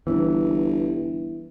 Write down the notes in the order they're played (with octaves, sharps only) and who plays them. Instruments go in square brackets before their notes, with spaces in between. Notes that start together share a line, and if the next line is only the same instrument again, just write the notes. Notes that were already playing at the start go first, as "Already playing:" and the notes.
[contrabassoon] G1 [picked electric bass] E3